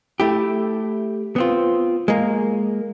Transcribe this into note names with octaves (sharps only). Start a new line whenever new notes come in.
A3 E4 G4
B3 C4 F4
G#3 A#3